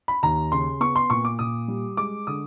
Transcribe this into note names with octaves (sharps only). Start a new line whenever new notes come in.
B5
D#2 A#5
C#3 C6
B3 C#6
C6
A#2 C#6
D6
A#2 D#6
G3
G#3 D6
D3 D#6